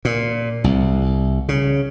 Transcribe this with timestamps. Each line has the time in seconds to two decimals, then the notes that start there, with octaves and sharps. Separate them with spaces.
0.05 A#2
0.64 C2
1.49 C#3